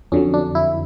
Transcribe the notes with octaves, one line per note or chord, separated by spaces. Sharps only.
F2 D3 F#3 C#4
D4
E4